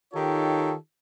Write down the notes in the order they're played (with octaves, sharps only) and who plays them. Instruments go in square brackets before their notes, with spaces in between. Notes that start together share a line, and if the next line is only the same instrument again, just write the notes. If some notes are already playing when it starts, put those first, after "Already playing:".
[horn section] D#3 D#4 F4 G4 A4 C#5